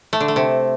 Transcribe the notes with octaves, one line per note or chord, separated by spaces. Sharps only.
A3
D3
A3
C3